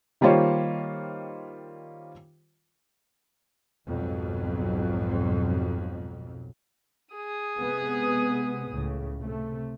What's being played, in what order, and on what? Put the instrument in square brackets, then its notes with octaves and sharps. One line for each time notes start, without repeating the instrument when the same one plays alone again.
[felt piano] D#3 G3 A#3 F4 C5 C#5
[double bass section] B1 F2 G#2 B2 F#3
[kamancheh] G#4 D#6
[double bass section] C3 G#3 B3
C#2 A2 C#3
C3 A3